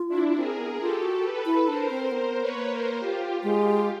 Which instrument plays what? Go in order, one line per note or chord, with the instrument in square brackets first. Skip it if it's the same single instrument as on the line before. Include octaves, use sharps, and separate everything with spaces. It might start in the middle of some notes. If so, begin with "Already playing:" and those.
Already playing: [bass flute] F4
[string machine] D4 E4
[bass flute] C4 [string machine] G#4 A#4
[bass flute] B3
[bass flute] F4 [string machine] G4 A4
[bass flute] F#4
[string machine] A4 B4
[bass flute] E4
[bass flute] D4 [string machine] A#4 C5
[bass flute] C4
[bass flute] B3 [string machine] A#4 C5
[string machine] B4 C#5
[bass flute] B3
A#3
[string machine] A#4 C5
F4 G4
[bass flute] G#3 [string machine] F4 G4